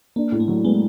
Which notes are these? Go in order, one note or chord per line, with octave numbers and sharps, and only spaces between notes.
A#3 D4
A2
A3
F#3
G#3 B3